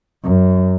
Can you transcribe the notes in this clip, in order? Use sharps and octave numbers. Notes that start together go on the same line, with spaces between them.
F#2